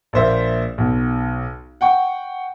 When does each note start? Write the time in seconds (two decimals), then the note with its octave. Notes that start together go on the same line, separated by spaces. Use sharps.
0.13 A#1 A#3 C5 E5
0.78 B1
1.81 F#5 G5 C#6